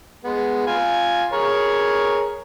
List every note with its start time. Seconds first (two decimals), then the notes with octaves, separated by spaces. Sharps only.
0.24 G#3 B3
0.67 F4 G#5
1.32 G#4 A#4 C#5